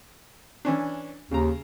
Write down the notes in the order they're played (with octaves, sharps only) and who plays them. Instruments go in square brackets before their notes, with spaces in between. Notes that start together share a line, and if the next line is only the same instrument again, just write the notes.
[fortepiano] E3 C#4 D4
[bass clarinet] D#2 [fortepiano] C#3 A#5